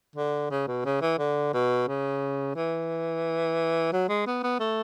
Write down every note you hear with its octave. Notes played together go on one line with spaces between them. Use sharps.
D3
C#3
B2
C#3
E3
D3
B2
C#3
E3
F#3
G#3
B3
B3
A3